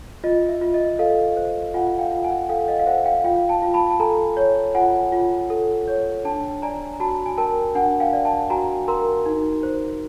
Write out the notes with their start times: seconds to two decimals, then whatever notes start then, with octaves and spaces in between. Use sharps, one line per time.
0.24 F4 D#5
0.49 E5
0.61 F4
0.74 D#5
0.99 A4 D#5 F5
1.37 C5
1.74 F4 F#5 G#5
1.99 F5 G5
2.11 F4
2.24 F#5 G#5
2.49 A4 F5 G5
2.68 D#5 F5
2.80 F5
2.87 C5 E5 F#5
3.05 F5 G5
3.24 F4 F5 G5
3.49 G5 A5
3.62 F4
3.74 A5 B5
3.90 A5
4.00 A4 G#5 A#5
4.37 C#5
4.75 F4 F#5 G#5
5.12 F4
5.50 A4
5.88 C#5
6.25 D4 G5 A5
6.62 D5 G#5 A#5
6.94 A#5
7.00 F#4 A5 B5
7.26 G#5
7.38 A#4 G5 A5
7.75 D4 F#5 G#5
8.00 F5 G5
8.13 D5
8.25 G5 A5
8.50 F#4 G#5 A#5
8.88 A#4 A#5 C6
9.26 D#4
9.63 C5